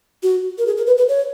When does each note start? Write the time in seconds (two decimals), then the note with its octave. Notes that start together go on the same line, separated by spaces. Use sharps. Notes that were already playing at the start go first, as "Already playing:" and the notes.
0.23 F#4
0.58 A#4
0.67 G#4
0.77 A#4
0.87 B4
0.98 B4
1.09 C#5